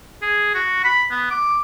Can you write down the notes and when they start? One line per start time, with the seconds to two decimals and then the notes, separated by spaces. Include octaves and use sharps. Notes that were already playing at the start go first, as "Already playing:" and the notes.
0.22 G#4
0.55 F#4
0.84 B5
1.11 B3
1.31 D6